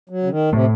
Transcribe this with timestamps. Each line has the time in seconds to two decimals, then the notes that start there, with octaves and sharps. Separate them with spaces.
0.09 F#3
0.23 C#3
0.30 D#3
0.53 A2 C3 A3